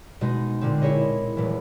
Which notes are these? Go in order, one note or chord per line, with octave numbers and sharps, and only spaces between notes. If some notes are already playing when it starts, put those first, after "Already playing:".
B2 G#3 D#4
A#2 D3 C4
E4 G#4 C#5 D#5
D#1 E3